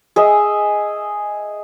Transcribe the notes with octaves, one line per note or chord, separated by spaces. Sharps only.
G#4 D#5 E5